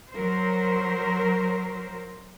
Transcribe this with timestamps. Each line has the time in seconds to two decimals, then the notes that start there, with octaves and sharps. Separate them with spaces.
0.11 F#3 A#4 C5